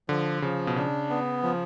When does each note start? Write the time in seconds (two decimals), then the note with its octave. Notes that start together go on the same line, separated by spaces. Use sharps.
0.09 D3 F3
0.42 C#3 F3
0.67 B2
0.76 C#3 D4
1.10 B3
1.43 F3